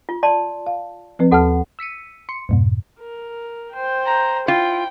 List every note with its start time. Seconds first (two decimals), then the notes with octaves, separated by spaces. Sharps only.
0.09 F4
0.23 D5 A5 C6
0.67 F5
1.19 F3 C4 B4
1.31 D#2 F#4 A4 F#5 A5 F6
1.79 E6 B6 C#7 D#7
2.29 C6 C#7
2.49 F2 G#2 B2
3.00 A#4
3.72 C5 G5
4.06 A#5
4.48 E4 F4 G5